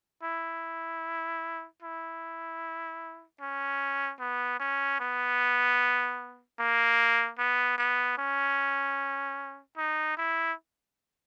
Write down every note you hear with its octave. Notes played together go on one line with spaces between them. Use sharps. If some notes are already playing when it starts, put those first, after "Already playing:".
E4
E4
C#4
B3
C#4
B3
A#3
B3
B3
C#4
D#4
E4